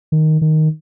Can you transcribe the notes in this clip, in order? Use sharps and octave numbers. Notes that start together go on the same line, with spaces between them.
D#3
D#3